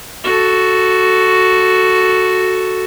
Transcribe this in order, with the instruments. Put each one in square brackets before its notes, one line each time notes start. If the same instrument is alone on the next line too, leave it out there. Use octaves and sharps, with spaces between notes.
[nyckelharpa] F#4 A4